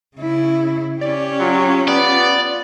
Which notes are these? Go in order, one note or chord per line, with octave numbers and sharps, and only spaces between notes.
C#3 E4
C#4 G4 D5
F#3 F4
B3 D5